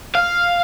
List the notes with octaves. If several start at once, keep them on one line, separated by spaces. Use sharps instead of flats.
F5